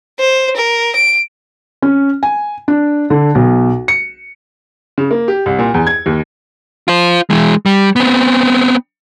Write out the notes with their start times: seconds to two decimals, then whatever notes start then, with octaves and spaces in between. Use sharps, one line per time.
0.19 C5
0.57 A#4
0.96 D7
1.82 C#4
2.23 G#5
2.68 D4
3.10 D3
3.35 B1
3.88 C#7
4.98 C#3
5.11 A#3
5.28 G4
5.46 C2
5.59 A#2
5.74 E2
5.87 G#6
6.06 D#2
6.88 F4 C5
7.30 E3 G#3
7.66 G3
7.96 B3 C4